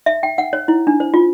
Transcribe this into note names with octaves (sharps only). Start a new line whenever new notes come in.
E5
G5
F#5
C#5
E4
D4
C5
F4